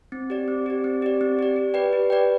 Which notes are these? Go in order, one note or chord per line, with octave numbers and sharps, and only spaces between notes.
C4
G4 D5
C4
G4 D5
C4
G4 D5
C4
G4 D5
G4
B4 D5 G5
G4
B4 D5 G5